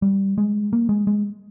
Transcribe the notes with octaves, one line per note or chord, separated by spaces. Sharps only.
G3
G#3
A#3
G#3
G#3